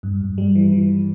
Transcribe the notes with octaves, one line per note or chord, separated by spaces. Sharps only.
G2
G2
G3
E3
E3